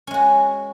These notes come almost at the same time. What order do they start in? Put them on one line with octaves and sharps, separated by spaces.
C#4 G#3 F#4